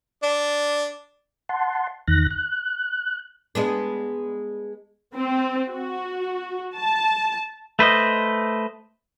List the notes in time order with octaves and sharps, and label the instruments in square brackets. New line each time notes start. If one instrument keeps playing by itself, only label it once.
[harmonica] D4
[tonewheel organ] F#5 A5 C6
E2 D#3 F#6 A#6
F#6
[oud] G#3 B3 D4
[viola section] C4
F#4
A5
[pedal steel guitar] A3 B4 C5 D#5